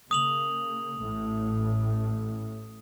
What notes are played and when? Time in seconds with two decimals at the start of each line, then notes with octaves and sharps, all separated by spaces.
0.11 C#3 A#3 D#6 F7 F#7
0.99 A1 A2 A3